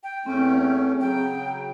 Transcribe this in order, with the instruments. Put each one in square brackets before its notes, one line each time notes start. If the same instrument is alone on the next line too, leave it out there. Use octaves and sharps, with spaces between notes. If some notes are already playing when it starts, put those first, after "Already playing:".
[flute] G5
[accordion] E2 A3 C#4 [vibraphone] C4
[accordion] C#3 F#3 [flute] G5